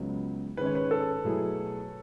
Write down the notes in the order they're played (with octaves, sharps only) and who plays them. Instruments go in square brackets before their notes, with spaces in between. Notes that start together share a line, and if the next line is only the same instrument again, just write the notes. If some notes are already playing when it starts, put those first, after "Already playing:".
Already playing: [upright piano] C#2 C#3 F#3 B3 F#4
[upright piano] G#2 D#3 G#3 C#4 [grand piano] B4
[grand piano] C#5
B4
A4
[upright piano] B2 F#3 A3 E4 G#4